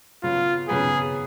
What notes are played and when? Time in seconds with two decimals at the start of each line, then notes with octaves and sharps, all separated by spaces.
0.23 C#3 F#3 B3 F4
0.68 C#3 F#3 B3 G#4